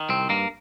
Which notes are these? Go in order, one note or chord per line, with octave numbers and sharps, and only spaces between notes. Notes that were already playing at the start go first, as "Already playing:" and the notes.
Already playing: D#3
C2 C4
G2 A#3